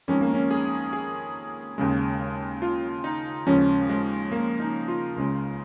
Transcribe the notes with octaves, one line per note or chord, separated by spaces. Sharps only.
F2 D#3 G#3 C#4
A#3
C#4
G#4
G#4
D#2 C#3 G#3
F4
D#4
D#2 C#3 F3 G#3 C#4
G#3
A#3
D#4
F4
C#2 C#3 G#3